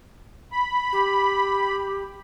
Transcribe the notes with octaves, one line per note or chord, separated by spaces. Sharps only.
B5
G4